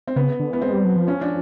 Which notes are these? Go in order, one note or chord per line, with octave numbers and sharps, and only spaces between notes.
C4
C#3 B3
D3
E3 B3
G#3 C4
G3
F#3
F3
C#4
D4